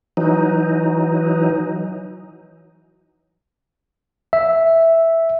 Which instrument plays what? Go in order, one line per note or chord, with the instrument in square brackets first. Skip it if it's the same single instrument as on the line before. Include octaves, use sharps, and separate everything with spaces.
[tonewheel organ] E3 F#3 D#4
[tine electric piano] E5